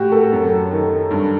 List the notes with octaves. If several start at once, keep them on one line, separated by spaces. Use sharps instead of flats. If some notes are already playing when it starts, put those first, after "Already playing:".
Already playing: A2 F#4 G4
A4
F#2
D#3
G2